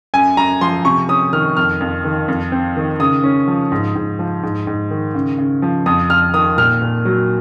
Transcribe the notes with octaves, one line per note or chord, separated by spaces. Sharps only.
F#2 G#5
F#2 A#5
F3 C6
C3 C#6
C#4 D#6
D#3 F6
F2 F6
F2
D#3
F2
C4
D#3
C#3 D#6
C#4
F3
G#2
G#2
F3
G#2
G#2
D#3
C#3
C#3
F3
F2 D#6
F2 F6
D#3 D#6
A#2 F6
A#2
F#3